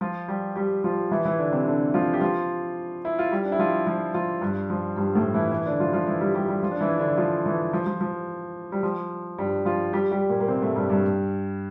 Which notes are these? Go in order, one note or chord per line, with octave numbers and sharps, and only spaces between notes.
F3 F4
G3 G4
G3 G4
F3 F4
E3 E4
E3 E4
D3 D4
C3 C4
D3 D4
F3 F4
G4
F3 F4
E4
F4
G3 G4
D4
E4
F3 F4
F3 F4
F3 F4
G2 G3
F3
G2 G3
A2 A3
E3 E4
E3 E4
D3 D4
F3 F4
F3 F4
E3 E4
G3 G4
G3 G4
G3 G4
F3 F4
D4
E3 E4
D3 D4
F3 F4
E3 E4
F3
F3
F3
G3
F3
G2 G3
F3 F4
G3 G4
G3 G4
A#2 A#3
A#3
C3 C4
A2 A3
G2 G3
G2 G3